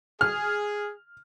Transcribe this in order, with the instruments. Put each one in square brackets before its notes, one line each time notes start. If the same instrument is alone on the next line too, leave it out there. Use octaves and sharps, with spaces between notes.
[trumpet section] G#4 [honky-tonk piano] F6